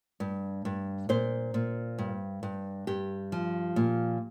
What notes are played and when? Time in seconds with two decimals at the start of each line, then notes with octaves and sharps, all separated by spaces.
0.20 G2
0.65 G2
1.09 A#2 C5
1.54 A#2
1.98 G2
2.43 G2
2.87 G2 G4
3.32 F3
3.76 A#2